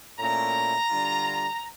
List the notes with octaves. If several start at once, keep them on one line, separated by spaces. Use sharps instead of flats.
A#2 A3 C#4 E4 A#5
D3 G3 D4 F4